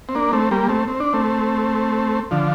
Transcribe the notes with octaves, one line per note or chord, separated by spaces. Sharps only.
C4
A#3 D4
A3 C4
G3 A#3
A3 C4
C4
D4
A3 C4
D3 F3